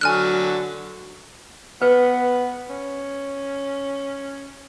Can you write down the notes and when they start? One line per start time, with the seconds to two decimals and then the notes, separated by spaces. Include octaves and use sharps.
0.01 D3 F#3 G#5 F6 F#6
1.82 B3 B4
2.70 C#4